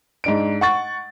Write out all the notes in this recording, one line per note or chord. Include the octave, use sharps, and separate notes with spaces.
G#2 D4 D7
F#5 C#6 A6